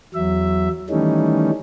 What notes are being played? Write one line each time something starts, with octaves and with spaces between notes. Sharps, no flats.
E2 F#3 E5
D#3 E3 G3 A3 C#4 D#4